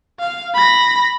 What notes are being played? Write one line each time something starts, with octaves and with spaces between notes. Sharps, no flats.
F5
B5 A#6